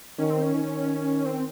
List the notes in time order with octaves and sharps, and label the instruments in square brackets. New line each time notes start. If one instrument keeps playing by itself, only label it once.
[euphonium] D#3 [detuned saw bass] C#4
[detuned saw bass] C4
C#4
[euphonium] D#3
[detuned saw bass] C4